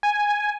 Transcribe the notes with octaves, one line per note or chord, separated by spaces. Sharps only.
G#5